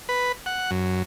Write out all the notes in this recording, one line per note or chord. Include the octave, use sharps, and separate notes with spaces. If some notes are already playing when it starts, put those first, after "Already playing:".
B4
F#5
F#2